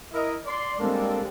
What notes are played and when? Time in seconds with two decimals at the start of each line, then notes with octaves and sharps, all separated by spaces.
0.13 E4 A#4 D#5
0.46 D5 C6
0.80 G3 G#3 A#3 C4 D4 A4